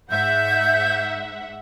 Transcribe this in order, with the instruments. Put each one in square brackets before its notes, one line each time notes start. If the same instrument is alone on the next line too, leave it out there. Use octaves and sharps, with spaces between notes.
[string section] G#2 E5 F#5 [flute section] G6